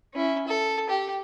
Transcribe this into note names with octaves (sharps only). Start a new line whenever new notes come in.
C#4 E4
A4
G4